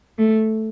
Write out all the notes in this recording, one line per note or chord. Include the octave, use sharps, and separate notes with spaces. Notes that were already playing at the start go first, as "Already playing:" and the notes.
A3